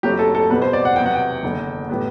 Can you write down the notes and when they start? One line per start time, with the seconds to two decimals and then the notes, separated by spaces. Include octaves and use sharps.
0.03 F#1 F#2 F#3 A3 C4 G4
0.19 A4
0.35 A4
0.50 E2 B2 G3 C4 B4
0.62 C5
0.73 D5
0.85 F#5
0.96 E2 C3 F#3 B3 G5
1.06 F#5
1.16 G5
1.43 F#1 E2 D3
1.89 A2 G3 B3